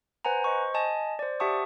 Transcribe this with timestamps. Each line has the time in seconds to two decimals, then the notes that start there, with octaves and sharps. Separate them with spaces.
0.25 B4 C5 F#5 G#5 A#5
0.44 C5 D#5 C#6
0.74 D#5 G#5 A5
1.19 C5 D5
1.40 G4 E5 F#5 A5 C#6 D#6